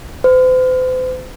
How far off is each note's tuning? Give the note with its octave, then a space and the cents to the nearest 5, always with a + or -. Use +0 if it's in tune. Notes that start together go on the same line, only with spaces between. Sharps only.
C5 -40